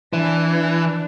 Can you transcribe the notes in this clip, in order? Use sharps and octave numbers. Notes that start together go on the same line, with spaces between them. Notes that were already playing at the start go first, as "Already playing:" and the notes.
E3 D4
D4